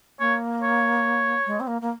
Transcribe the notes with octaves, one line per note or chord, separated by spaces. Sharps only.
A#3 C#5
C#5
G#3
C4
A#3
A#3